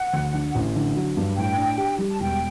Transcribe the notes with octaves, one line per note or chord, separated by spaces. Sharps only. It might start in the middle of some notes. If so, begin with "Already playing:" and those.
Already playing: F#5
D2
D3
A1
D3
F#3
G2
A2 G5
D4
G4
G3
A5
E1 G5